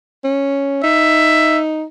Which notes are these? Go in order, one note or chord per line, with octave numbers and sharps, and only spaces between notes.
C#4
D#4 E5